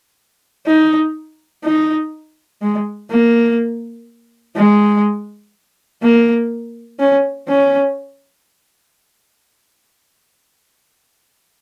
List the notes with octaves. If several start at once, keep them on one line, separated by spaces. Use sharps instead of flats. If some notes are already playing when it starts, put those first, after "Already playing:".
D#4
D#4
G#3
A#3
G#3
A#3
C#4
C#4